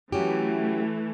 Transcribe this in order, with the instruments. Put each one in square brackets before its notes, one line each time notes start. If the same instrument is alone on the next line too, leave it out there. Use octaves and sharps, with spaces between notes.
[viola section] E3 A3 [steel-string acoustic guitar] F#3 C#4 G4